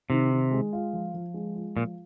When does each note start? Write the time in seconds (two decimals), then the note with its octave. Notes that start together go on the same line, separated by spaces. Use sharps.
0.10 C3 D#3
0.31 D#3
0.52 G#3
0.73 F4
0.93 F3
1.14 F3
1.34 G#3
1.55 F4
1.76 A#2 F3